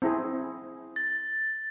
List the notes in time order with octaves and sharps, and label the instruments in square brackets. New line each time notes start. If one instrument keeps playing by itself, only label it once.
[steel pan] C4 E4 G#4
[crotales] A6